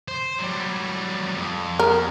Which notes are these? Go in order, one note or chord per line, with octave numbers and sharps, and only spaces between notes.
C5
F#3 G3
F2
A#4